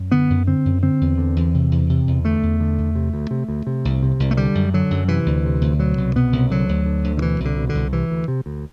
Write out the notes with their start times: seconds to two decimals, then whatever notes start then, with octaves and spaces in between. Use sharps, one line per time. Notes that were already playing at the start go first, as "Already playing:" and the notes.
Already playing: F#2
0.12 D3 B3
0.30 F#2
0.47 D3 C4
0.65 F#2
0.82 D3 C4
1.01 E2
1.18 D3
1.36 E2
1.54 C3
1.72 E2
1.90 C3
2.07 E2
2.25 D3 A3
2.43 E2
2.60 D3
2.78 E2
2.95 C3
3.14 D2
3.31 C3
3.48 D2
3.67 C3
3.85 C2
4.03 C3
4.20 C2
4.31 A3
4.37 D3 G3
4.55 F#2
4.74 D3 F#3
4.91 F#2
5.08 C3 E3
5.26 D2
5.45 C3
5.61 D2
5.79 B2 F#3
5.98 C2
6.16 B2 B3
6.33 C2
6.50 D3 F#3
6.69 D2
6.86 D3
7.04 D2
7.17 D3
7.21 B2 E3
7.40 C2 D3
7.57 B2
7.69 D3
7.75 C2
7.93 C3 E3
8.11 D2
8.28 C3
8.46 D2